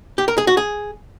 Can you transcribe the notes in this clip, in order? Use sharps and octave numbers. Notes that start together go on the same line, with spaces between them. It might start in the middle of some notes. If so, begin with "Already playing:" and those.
G4
A#4
G#4
F#4
G#4